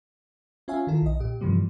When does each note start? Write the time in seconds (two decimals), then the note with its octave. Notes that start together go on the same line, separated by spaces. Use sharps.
0.68 C#4 F4 C#5 E5 F5 G#5
0.87 D#3 E4 F4 A4
1.02 B1 D#5
1.20 A#2 G4
1.41 G2 C3 E3 F3 G3 A#3